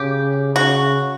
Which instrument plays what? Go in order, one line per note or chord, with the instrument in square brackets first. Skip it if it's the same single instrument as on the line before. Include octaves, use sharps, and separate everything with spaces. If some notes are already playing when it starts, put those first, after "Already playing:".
Already playing: [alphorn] C#3 [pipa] G4
[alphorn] C#3 [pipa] F#4